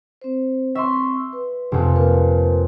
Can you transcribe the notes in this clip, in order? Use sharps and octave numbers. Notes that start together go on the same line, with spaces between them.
C4 C5
C4 E5 C6 C#6 E6
B4
F1 F2
A#3 A#4 B4